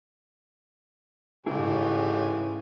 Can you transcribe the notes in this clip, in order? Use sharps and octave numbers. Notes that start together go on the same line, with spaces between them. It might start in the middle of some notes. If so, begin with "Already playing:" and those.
A1 G#2 C#3 E3 E4 G4 G#4 G#5